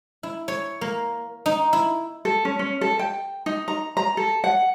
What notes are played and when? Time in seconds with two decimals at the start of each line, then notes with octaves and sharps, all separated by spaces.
0.23 E4
0.48 C#5
0.81 A#3
1.46 D#4
1.73 E4
2.25 A4
2.45 C#4
2.59 C#4
2.81 A4
2.99 G5
3.46 D#4
3.68 A#5
3.97 A#5
4.17 A4
4.44 F#5